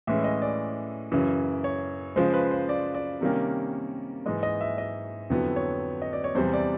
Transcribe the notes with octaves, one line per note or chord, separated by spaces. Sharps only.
A2 E3 G#3 C#4 E5
D#5
D5
F#2 C#3 E3
C#5
C#3 F3 G#3 C5
B4
C5
D5
D5
C3 D#3 G3 A#3 C#4
G#2 E3 G#3 D#5
D#5
E5
D#5
F2 D3 F#3 B3 E4
C#5
D#5
D5
C#5
E2 C3 E3 G3 C5
D5